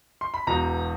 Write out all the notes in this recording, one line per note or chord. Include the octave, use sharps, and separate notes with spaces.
C6
B5
E1 E2 B2 A#5